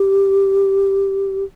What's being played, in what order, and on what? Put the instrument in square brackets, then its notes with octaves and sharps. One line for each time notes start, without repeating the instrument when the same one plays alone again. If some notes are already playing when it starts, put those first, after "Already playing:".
Already playing: [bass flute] G4